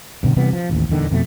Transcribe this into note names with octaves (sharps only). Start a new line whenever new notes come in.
G2 B2 D3
C3 E3 G3 B3
F3
A1 D#2
D#1 E2 D3 D#3
F2 B2 A3